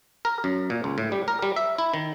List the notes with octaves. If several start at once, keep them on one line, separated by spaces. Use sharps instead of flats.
A#4
F#2
A#2
C#2
A2
G3
A#4
G3
E5
E4
D#3